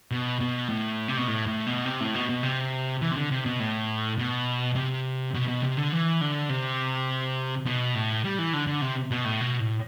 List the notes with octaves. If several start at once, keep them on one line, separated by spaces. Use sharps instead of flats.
B2
B2
A2
C3
B2
A2
A2
B2
C3
A2
B2
B2
C3
E3
C3
D3
C3
B2
A2
B2
C3
B2
B2
C3
D3
E3
D3
C3
B2
A2
G3
E3
D3
D3
C3
B2
A2
B2
A2